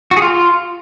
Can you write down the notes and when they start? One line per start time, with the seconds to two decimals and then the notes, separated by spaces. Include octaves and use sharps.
0.11 F#4
0.17 G#4
0.22 F4